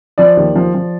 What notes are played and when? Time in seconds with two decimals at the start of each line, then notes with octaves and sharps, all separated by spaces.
0.18 F3 D5
0.37 D#2
0.55 F3
0.75 F3